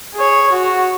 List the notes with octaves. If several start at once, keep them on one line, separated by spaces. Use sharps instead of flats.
G#4 C#5
F#4